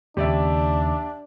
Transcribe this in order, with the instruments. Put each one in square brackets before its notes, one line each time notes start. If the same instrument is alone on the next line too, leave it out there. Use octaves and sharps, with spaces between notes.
[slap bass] D#2 C#3 [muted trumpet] D4 [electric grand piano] G4 D5 E5